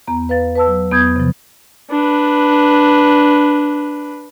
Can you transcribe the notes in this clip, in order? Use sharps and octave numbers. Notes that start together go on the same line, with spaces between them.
E2 B3 A#5
B4 F5 A6
B4 A5 E6
F#3
E2 B3 D#6 G6 G#6
C3 F3
D4 B4